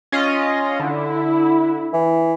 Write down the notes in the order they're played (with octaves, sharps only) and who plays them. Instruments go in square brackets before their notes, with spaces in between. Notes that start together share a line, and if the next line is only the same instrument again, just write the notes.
[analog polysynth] C#4 F4 D#5
[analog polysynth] D3 [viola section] E4
[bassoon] E3